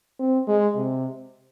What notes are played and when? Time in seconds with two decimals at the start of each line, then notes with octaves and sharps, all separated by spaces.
0.19 C4
0.48 G#3
0.76 C3